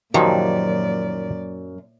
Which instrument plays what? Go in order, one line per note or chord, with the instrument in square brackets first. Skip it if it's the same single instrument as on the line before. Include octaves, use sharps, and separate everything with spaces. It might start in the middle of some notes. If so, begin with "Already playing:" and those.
[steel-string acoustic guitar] F#2 [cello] A#2 D5 [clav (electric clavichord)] D#3 F3 [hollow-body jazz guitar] F#3 F#4 G4